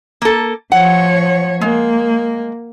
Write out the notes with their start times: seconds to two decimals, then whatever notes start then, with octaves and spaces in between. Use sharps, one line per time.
0.22 A#3 A4
0.72 F3 C#5 F#5
1.61 G#3 A#3